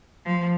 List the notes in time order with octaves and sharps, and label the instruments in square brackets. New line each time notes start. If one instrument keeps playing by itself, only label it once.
[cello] F3